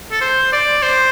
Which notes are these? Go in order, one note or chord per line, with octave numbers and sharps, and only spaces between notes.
A4
C5
D5
C5